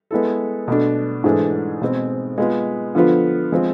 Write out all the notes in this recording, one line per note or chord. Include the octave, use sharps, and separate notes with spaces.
G#3 B3 E4 A4
B2 A3 D4
G#2 E3 A3 D4 G#4
B2 G#3 C4
G#3 B3 F4
D3 F3 B3 F4
F3 G#3 C4 F4